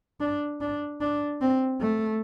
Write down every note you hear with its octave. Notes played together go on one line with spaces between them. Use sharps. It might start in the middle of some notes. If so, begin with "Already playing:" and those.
D4
D4
D4
C4
A3